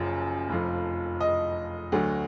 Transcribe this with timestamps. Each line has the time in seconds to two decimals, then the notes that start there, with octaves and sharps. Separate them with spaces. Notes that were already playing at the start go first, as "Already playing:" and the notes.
Already playing: F#1 F#2 F3
0.49 F1 F2 F3
1.21 D#5
1.92 D2 D3 F#3